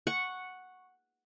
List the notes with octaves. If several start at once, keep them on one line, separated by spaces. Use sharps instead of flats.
F#5 C#6